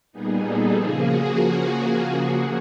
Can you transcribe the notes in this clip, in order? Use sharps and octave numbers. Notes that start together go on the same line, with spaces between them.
A#2 G3 B3 D#4 G#4
A4
C#3 F3 A#3 G#4
F#4